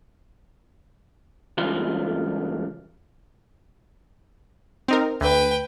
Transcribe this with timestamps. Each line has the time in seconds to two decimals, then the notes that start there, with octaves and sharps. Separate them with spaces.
1.58 C#2 G2 E3 F4 C6
4.88 C4 D#4 A#4
5.21 D2 B4 G5